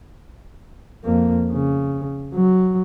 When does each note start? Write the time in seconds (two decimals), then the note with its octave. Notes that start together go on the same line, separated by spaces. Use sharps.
1.04 F2 A#3
1.51 C#3
2.34 F#3